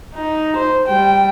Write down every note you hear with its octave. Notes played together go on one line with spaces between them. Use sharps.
D#4
C5
G3 G5